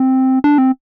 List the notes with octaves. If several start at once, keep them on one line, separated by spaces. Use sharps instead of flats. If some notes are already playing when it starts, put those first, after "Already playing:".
Already playing: C4
D4
C4